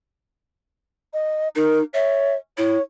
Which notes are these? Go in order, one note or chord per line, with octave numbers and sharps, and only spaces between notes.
D#5
D#4 A#4
C#5 E5
E4 C#5